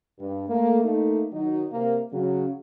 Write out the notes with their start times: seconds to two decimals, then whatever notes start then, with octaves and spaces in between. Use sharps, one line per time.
0.19 G2
0.49 A3 A#3
0.84 A3 A#3 D#4
1.32 D#3 F#3 D#4
1.71 C3 A#3
2.13 C#3 F#3